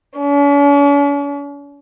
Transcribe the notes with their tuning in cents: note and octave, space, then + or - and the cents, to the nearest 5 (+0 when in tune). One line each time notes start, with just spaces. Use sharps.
C#4 +45